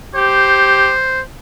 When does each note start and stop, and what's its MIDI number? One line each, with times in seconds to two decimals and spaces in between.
0.15 0.92 67
0.15 1.21 72